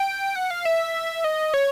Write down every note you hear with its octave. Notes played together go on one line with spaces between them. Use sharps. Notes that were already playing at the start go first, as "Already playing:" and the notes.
Already playing: G5
F#5
F5
E5
D#5
C#5